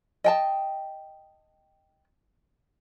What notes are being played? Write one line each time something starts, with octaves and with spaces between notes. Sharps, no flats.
D#5 G5 A5